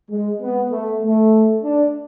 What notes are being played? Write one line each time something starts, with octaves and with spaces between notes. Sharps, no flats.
G#3
B3
A3
A3
D4